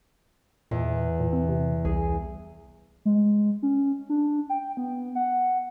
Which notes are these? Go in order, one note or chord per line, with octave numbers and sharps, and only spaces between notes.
E2 A#2
A#2
C4
C3
C2 G#4
G#3
C#4
D4
G5
B3
F#5